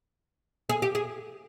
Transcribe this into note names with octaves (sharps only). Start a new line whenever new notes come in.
G#4
G4
G#4